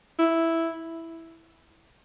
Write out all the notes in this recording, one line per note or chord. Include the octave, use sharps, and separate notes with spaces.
E4